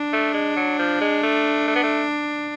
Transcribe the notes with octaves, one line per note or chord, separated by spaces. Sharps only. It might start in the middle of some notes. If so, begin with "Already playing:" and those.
Already playing: D4
A3
G#3
F#3
F3
G#3
A3
A3
B3
A3